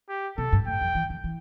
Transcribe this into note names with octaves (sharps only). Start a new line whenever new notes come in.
G4
C3 A4
G2
A2 G5
F2
E3
D3
E3